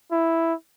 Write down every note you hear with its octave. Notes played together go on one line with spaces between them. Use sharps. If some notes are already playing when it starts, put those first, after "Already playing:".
E4